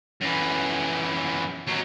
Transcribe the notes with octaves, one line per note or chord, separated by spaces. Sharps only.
F#2 E3
D#2 F#3